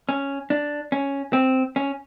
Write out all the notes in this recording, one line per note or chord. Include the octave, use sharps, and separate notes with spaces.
C#4
D4
C#4
C4
C#4